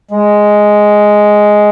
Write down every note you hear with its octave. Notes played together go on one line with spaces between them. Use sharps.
G#3